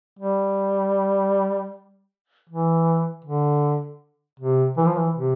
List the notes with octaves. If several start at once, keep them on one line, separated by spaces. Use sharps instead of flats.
G3
E3
D3
C3
E3
F3
E3
C3